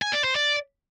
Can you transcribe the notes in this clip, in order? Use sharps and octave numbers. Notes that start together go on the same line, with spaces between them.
G#5
D5
C5
D5